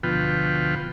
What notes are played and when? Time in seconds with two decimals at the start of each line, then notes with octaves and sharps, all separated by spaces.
0.03 D2 B2 F3 F4 B4 G5